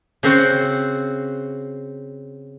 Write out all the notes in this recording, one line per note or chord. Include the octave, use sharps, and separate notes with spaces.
C#3 C4 F#4